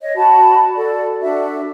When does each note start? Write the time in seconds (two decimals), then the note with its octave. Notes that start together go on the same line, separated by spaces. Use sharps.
0.01 C#5 D#5
0.17 F#4 A5 B5
0.75 F#4 A4 D5
1.22 D4 F#4 A4 E5